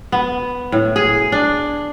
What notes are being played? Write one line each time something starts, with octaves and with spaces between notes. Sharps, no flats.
B3
A2
G#4
D4